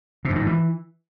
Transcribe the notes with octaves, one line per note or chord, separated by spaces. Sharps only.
C3
F#2
D#3
G#2
E3